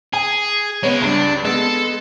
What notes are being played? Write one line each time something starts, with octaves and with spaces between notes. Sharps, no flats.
G#4 G#5
G#3 B3 C#4 C#5
C#2 G2 D4
G#3 B3 A4